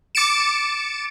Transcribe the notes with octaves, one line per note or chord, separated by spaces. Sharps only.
D6 A6 C#7 D7 E7